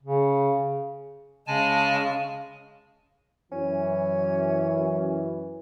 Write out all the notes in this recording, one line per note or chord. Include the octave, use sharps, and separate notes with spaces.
C#3
C#3 G#3 G#5 A5
F#2 E3 C#4